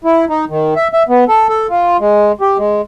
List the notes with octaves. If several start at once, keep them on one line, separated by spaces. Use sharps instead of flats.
E4
D#4
D#3
E5
E5
B3
A4
A4
F4
G#3
G4
G#3